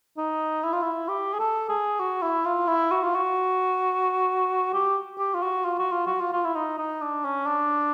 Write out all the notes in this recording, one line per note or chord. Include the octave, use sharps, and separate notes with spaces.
D#4
E4
F4
E4
G4
G#4
A4
G#4
F#4
E4
F4
E4
F#4
F4
F#4
G4
G4
F4
F#4
F4
F#4
F4
F#4
F4
F4
E4
D#4
D#4
D4
C#4
D4